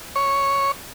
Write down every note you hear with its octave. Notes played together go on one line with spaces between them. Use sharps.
C#5